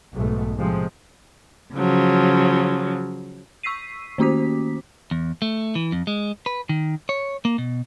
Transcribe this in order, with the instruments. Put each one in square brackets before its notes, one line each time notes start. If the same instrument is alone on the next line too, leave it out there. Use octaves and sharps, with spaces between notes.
[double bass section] B1 G#2 G#3 A3
A2 C3 F3 G#3 C4
[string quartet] C#3 F3 F#3
[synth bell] C#6 E6 B6 C7 D#7
D#3 A#3 C#4 F#4 D6 B6
[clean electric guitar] E2
A3
E3
F2
G#3
B4
D#3
C#5
A#3
B2